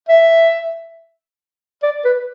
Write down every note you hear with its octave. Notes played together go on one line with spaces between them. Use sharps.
E5
D5
B4